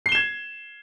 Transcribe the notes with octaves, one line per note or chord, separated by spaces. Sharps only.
G#6 C7 E7 G7